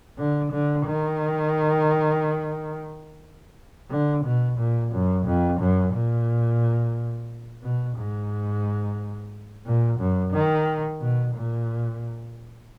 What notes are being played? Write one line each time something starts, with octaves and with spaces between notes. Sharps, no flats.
D3
D3
D#3
D3
B2
A#2
F#2
F2
F#2
A#2
B2
G#2
A#2
F#2
D#3
B2
A#2